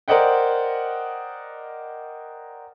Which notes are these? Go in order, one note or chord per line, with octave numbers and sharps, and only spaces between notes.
A#4 C5 D5 D#5 F#5 G5